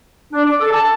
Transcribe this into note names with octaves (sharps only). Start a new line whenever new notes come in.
D4
D6
A4
A5